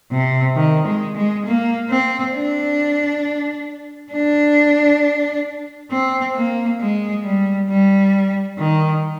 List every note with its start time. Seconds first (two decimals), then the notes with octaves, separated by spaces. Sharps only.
0.12 C3
0.56 D#3
0.86 G#3
1.15 G#3
1.45 A#3
1.90 C4
2.35 D4
4.12 D4
5.91 C4
6.35 A#3
6.80 G#3
7.24 G3
7.70 G3
8.59 D#3